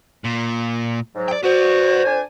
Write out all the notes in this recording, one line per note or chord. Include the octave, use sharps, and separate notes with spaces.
A#2
G#2 F#3
D5 G5
F#4 B4 C5 D5
F2 D4 G#5